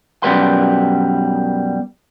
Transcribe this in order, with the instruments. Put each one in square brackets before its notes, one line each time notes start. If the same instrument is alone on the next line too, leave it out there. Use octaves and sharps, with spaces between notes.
[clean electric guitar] F#2 B2 G3 B4 C6